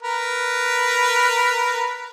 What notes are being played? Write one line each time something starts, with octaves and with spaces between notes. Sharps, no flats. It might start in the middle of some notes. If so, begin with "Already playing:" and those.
A#4 B4